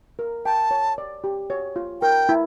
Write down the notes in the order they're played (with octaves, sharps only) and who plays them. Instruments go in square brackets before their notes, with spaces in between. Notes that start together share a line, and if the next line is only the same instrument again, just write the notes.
[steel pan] A#4
[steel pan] G5 [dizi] A5
[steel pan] C#5
D5
G4
C#5
F4
[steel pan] A#4 [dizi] G5
[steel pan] E4